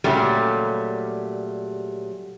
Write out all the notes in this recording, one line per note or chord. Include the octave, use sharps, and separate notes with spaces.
A#2 C#3 F#3 G3 A3 G4